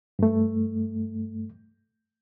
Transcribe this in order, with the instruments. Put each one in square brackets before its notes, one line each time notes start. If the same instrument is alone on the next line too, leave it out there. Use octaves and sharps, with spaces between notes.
[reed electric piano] G2 A3